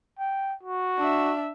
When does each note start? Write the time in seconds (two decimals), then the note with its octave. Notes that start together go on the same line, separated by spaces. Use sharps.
0.19 G5
0.63 F#4
0.98 D4 E5